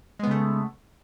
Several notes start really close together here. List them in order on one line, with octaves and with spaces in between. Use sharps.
G#3 B3 C#3 A3